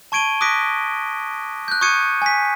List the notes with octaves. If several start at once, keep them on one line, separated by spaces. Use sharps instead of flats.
A5 C#6 G#6 D7 D#7 G7
D6 D#6 F#6 A#6 B6 D7
F#6 G6
C#6 D#6 G6 G#6 C#7 D#7
G#5 B6